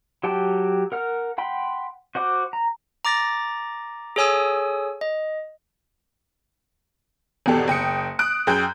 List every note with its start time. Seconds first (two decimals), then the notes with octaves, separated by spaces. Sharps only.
0.23 F#3 G4 F#5 G5 A5
0.92 A#4 F#5 F6
1.38 F#5 G5 B5 C6
2.15 F#4 C5 F#5 D6
2.53 A#5
3.05 A#5 D6 A6 A#6
4.16 G#4 A4 C#5 G#5 D#6 E6
5.01 D#5
7.46 G#1 E2 B2 G4 A4
7.68 F#1 G5 D#6 C#7
8.19 D#6 F#6 D7
8.47 F#2 G#4 G5 G6